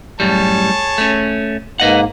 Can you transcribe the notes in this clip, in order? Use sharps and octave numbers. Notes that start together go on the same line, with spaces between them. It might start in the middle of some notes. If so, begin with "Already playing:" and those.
F#2 A2 G3 G#4 C#5 A5
A3 C#4
G#2 A#3 B4 D#5 F#5